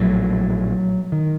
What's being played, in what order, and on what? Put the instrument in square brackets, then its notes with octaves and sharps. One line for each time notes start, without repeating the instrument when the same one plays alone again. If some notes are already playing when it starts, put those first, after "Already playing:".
Already playing: [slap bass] A#1 A2 F#3
D#3